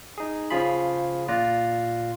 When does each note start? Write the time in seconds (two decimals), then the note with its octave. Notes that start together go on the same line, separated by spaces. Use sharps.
0.18 D#4 G#4
0.50 C#3 F3 F4 G#4 B5
1.28 A#2 F4 D5 F#6 A#6